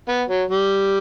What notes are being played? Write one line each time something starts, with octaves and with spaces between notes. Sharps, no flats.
B3
F#3
G3